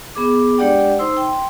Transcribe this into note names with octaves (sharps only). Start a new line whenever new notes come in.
B3 G#4 D6
G#3 D4 G4 D5 F#5 G5
D#4 C5 C6 E6
G5 C6